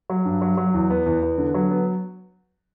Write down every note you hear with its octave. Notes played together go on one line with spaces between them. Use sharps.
F#3
G2
F#3
F#3
E2
B3
E2
B3
D3
F#3
B3